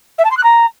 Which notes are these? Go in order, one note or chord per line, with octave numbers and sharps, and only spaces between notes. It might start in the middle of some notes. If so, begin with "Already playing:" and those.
E5
A5
C6
F#6
A#5